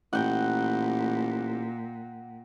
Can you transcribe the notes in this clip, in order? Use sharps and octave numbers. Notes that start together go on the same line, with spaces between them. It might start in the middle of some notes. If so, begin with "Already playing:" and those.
A1 A#2 F#5 G5